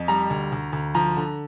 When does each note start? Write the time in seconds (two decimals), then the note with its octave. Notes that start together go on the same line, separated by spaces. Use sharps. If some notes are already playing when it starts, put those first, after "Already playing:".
Already playing: F2
0.08 G3 A#5
0.30 D2
0.52 D2
0.73 D2
0.94 F3 A#5
1.16 D3